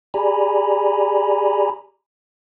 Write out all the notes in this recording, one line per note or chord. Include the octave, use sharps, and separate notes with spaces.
G4 G#4 D5 G#5 A#5 B5